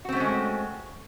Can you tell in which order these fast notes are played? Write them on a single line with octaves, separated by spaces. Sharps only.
F#4 C4 A3 C#4 G#3